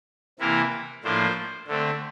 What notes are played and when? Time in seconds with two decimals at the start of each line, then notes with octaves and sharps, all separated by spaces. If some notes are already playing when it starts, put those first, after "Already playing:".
0.39 C3 E3 A#3 E4 A#4
1.03 A2 F3 A#3 D4 C5
1.67 D3 A3 C4